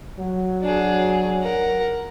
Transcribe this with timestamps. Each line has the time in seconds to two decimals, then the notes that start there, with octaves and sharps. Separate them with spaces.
0.17 F#3
0.62 D4 G#4
1.43 A#4 F#5